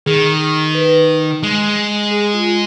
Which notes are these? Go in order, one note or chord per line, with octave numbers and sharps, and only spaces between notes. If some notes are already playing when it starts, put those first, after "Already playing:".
D#3 G#4
B4
G#3
G#4
F4